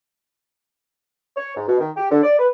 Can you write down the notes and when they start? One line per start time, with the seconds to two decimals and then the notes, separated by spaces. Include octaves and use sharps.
1.37 C#5
1.56 G#2
1.68 B2
1.80 D#3
1.96 G4
2.11 D3
2.23 D5
2.39 B4